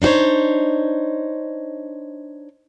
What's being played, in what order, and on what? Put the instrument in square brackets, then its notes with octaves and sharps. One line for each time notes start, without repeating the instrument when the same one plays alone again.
[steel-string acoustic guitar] D4 D#4 F#4 C5 C#5